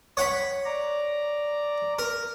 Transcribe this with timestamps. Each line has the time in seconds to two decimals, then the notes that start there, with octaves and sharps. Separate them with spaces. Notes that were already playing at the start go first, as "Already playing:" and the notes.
0.17 C#5 F#5 B5
0.65 D5 A#5
1.99 A#4